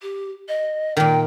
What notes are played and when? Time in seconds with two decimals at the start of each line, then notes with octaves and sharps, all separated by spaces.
0.02 G4
0.48 D#5
0.97 A#2 D#3 G5